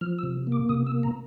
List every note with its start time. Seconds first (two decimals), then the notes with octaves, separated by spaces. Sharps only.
0.01 F3 F6
0.19 E6
0.23 C3
0.47 A#3 D6
0.69 C3 D#6
0.86 E6
0.92 A#3
1.03 A#5